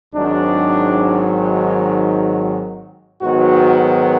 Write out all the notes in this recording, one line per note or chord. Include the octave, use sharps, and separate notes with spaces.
G#1 G#2 D#3 F#3 D4
G#2 D#3 F#3 B3 F#4